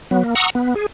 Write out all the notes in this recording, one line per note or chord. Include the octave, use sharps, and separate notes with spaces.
F#3 B3
A#3
F#5 A#5 C#6 D#6 E6
B3
G#4